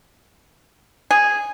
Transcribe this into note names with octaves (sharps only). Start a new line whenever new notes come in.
G#4